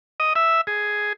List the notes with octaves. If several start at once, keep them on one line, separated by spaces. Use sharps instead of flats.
D#5
E5
G#4